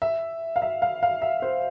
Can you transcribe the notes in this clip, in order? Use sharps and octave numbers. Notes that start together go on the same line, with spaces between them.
E5
F5
E5
F5
F5
E5
C5